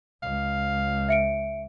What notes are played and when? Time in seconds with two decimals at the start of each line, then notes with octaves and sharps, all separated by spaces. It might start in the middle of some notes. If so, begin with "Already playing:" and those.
0.23 C#2 F5
1.09 E5 C#7 D7